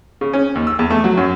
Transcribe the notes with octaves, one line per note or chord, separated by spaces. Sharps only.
C#3
C#4
D#2
E6
E2
A3
F#3
F#2